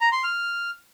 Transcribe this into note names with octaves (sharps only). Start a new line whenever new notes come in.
A#5
C6
F6